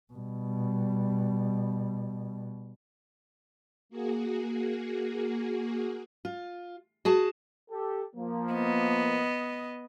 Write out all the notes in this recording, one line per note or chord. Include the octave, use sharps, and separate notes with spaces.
B2 G3
A#3 F#4 G#4
F4
F#4 G#4 A5
G4 A4
F3 A#3
B3 D#5